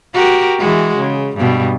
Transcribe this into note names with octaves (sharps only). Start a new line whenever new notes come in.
F#4 G4 A#4
E3 G#3 F#4
C#3
G2 B2